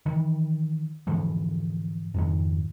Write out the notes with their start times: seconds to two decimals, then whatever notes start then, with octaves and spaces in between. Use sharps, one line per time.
0.06 D#3 E3
1.07 G#2 D3 E3 F3
2.14 F2 G#2 D#3